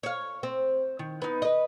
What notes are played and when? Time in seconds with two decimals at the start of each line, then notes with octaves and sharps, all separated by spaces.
0.03 C#5 F5
0.43 C4
0.99 D#3
1.22 B3 D#4
1.42 B4 D#5